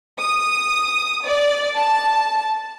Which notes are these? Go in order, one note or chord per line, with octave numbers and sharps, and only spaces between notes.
D#6
D5
A5